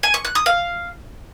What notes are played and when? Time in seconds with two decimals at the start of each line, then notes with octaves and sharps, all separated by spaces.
0.03 G#5
0.14 C#6
0.25 F#6
0.35 D#6
0.46 F5